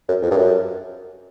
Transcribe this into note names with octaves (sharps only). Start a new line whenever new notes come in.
F#2
F2
G2
F#2